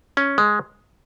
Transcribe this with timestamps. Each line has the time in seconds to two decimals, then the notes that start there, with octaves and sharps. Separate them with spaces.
0.17 C#4
0.38 G#3